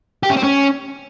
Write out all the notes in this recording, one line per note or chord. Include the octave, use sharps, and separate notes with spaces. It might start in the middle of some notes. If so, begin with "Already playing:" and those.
G4
C#4
C4
C#4